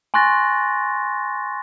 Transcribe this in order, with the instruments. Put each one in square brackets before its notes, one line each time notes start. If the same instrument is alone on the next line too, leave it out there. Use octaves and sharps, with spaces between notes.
[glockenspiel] G#5 C6 C#6 F#6 A6 A#6